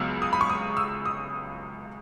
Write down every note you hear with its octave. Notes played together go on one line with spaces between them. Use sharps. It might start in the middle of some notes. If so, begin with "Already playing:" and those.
Already playing: C#2 C#3 F#3 B3 E6
D#6
B5
C#6
D#6
E6
D#6